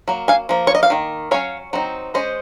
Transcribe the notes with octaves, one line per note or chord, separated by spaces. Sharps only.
F#3 A#3
F5 G#5
F3 A#3
C#5
D#5
F5
D#3 A#3
F#3 C#4 C#5 F5
F#3 C4 D#4
G#3 C#4 C5 D#5